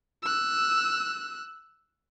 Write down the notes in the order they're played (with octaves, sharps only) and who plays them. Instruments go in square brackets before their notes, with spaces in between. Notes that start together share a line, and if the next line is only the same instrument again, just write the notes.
[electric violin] E6 F#6